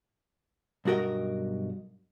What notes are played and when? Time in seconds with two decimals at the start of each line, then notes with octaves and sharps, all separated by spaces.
0.85 B1 G2 F#4 A#4 D#5